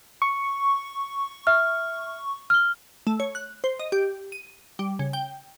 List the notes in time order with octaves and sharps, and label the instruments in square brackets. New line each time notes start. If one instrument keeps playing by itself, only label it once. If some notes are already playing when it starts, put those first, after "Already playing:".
[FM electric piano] C#6
[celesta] E5 F6
F6 G7
[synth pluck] A3
C#5
F#6
C5
D#5
G4
D#7
G3
C#3
G5